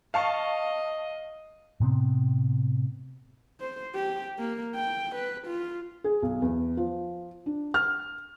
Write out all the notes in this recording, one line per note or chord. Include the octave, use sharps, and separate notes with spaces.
D#5 F5 A5 C#6
A2 C3 B3 C4
C5
G4
A#3
G5
B4
F4
G#4
B1
E2
F3
D4
F6